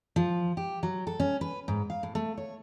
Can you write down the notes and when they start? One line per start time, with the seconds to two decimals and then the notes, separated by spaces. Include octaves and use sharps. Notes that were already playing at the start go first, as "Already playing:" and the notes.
0.16 F3
0.57 G4
0.83 F#3
1.07 A4
1.20 C#4
1.41 B4
1.68 G#2
1.90 F5
2.03 A2
2.15 A3
2.37 C#5